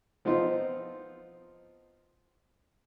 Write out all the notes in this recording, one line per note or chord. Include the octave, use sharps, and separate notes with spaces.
F3 B3 C4 D#4 F4